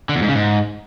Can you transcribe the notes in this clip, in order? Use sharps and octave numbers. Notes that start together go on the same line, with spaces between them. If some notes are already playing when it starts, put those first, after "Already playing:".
D3
E2
G#2
C#3
G#2